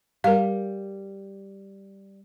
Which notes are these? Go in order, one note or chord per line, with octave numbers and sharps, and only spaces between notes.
G3 A#4 F5